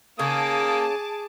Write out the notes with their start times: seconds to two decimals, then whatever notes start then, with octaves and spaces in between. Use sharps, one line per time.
0.19 C#3 A#3 G#4 A5 D6 D#6